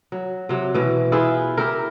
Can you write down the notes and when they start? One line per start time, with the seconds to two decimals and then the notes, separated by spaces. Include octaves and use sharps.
0.12 F#3
0.49 C3 F#3
0.74 B2 E3
1.12 E4 F4 G#4 B4
1.57 E4 G4 A#4